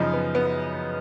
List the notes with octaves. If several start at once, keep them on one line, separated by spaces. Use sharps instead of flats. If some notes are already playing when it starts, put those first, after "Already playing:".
Already playing: F#2 C#3 F3 D#4
B3
B3